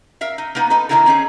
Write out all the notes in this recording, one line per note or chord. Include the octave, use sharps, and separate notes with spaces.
A#4 E5 F5
D#4
A#3 B3 D#4 B4
D#4 A4 B4
D3 D#3 B3 E4 A4 A#4
C4 C#4 D#4 G#4